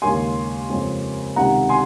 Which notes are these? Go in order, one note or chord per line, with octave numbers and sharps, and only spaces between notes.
D#2 C#3 G#3 G#5 C6
F2 C#3 G#3 C4
C#2 C3 D#3 G#3 F#5 A#5
G#5 C6